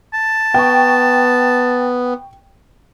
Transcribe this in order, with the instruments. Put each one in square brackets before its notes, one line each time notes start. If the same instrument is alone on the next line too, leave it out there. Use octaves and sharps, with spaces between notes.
[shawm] A5
[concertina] B3 [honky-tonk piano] G5 C#6